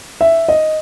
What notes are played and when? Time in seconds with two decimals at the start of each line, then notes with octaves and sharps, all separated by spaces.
0.21 E5
0.48 D#5